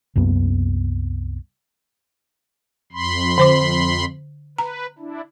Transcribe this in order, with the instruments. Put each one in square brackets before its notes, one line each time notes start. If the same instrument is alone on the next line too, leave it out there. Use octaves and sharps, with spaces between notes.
[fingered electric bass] C2 F#2 A#3 B3
[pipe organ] F2 B5 C6
[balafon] D3 C5 D6
[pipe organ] B4 [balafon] A#5
[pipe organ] D4 E4